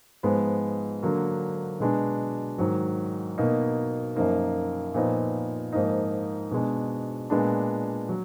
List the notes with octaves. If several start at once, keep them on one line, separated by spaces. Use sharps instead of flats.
G#2 F3 G#3 B3
D3 F#3 A#3
B2 G#3 B3 D4
G#2 D#3 F#3
B2 A#3 D#4
F#2 F3 A#3 D#4
A#2 F3 B3 D#4
G#2 F3 A#3 D#4
B2 G#3 D4
A#2 G#3 B3 D4
F#3